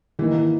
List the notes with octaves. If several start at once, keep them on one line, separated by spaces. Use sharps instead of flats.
D#3 E3 A#3 D#4